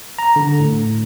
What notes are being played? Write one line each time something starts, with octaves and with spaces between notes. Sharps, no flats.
A#5
D3
A2